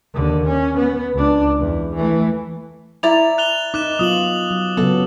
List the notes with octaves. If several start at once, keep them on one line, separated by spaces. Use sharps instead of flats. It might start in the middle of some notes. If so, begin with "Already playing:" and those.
D#2 D3
C#4
B3
C#2 D4
E2
E3 A3
E4 D5 A#5 A6 F7
F#6 F7 G7
D#4 D6 F#6 E7
F#3 B3 F4 D#6 F#7
F#3
C#3 F#3 B3 A4